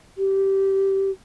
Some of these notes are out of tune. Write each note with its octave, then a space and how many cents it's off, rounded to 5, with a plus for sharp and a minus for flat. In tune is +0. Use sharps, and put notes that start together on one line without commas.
G4 -15